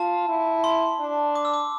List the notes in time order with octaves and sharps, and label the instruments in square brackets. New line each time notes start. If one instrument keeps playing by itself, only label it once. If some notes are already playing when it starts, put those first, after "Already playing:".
Already playing: [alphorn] F4 [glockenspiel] A5
[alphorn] E4
[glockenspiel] C6
[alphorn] D4
[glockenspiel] D6
E6
D6